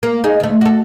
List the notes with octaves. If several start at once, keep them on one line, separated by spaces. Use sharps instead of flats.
A#3
D#4 G#4
D2 A3
F#4 A4